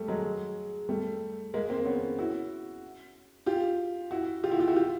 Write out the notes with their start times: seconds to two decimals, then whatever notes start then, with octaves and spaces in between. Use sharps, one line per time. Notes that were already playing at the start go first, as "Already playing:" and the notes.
Already playing: G3 A3
0.08 F#3 G#3
0.89 G3 A3
1.54 G#3 A#3
1.70 A#3 C4
1.85 B3 C#4
2.19 E4 F#4
3.46 F4 G4
4.11 E4 F#4
4.44 F4 G4
4.51 E4 F#4
4.59 F4 G4
4.68 E4 F#4
4.76 F4 G4